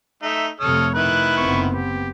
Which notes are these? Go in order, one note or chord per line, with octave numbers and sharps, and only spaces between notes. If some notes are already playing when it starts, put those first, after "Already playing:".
A3 D#4 E5
F2 C3 A3 A4 C#5 D#6 F6
D#3 E4 B4 F#6
F#1 B3 C4 C#6
G4